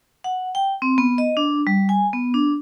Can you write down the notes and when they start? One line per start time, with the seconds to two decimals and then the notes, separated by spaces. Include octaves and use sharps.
0.24 F#5
0.55 G5
0.82 C4
0.98 B3
1.18 D#5
1.37 D4
1.67 G3
1.89 G#5
2.13 B3
2.34 D4